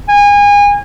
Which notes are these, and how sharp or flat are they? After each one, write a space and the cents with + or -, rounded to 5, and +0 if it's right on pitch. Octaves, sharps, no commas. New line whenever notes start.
G#5 -30